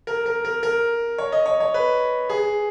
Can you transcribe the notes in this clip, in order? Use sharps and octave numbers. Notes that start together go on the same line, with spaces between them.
A#4
A#4
A#4
A#4
C#5
D#5
C#5
C#5
B4
G#4